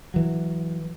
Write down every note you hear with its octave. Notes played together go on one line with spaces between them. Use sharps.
E3 F#3